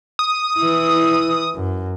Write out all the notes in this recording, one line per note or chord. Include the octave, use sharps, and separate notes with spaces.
D#6
E3 E4
F#2